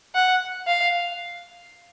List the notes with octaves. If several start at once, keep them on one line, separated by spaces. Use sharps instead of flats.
F#5
F5